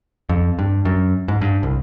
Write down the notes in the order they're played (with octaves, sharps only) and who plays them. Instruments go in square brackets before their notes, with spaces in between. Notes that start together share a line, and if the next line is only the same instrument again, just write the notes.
[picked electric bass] F2
G2
F#2
G#2
G2
C2